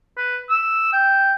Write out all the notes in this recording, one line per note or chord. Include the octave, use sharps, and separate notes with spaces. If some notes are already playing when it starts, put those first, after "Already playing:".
B4
E6
G5